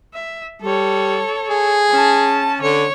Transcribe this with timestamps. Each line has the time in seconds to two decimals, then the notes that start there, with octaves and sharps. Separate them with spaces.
0.14 E5
0.62 G3 A4 C#5
1.50 G#4
1.90 C#4 A5
2.61 D3 C#5